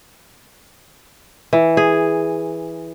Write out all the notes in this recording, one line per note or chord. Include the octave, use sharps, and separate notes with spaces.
E3
G#4